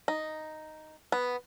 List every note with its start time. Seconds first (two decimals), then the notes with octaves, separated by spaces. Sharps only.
0.08 D#4
1.12 B3